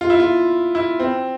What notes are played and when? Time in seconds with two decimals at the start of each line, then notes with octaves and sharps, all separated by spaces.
0.01 F4
0.10 E4
0.20 F4
0.75 E4
1.00 C4